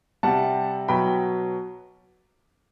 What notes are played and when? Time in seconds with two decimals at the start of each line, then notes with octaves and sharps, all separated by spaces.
0.23 C3 G3 F#5 A5
0.88 B2 F#3 G5 B5